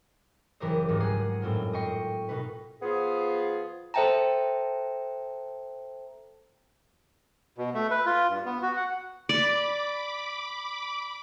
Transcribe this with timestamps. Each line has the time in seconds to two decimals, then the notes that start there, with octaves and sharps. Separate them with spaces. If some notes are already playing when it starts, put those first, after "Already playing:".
0.60 F#1 E3 G4 A#4 C5 D#5
0.88 C#2 G#2 D#3 F3
1.00 G#4 F#5 D#6 C7
1.42 F#2 A2 C4 F4
1.73 D#5 G5 C#6 C7
2.29 B2 D#4 B4
2.82 F3 B3 F4 G#4
3.94 A4 C5 E5 G5 A5 A#5
7.58 B2
7.74 A3
7.91 B4
8.06 F4
8.29 G2
8.46 B3
8.62 F#4
8.77 F#5
9.29 D5 B5 D6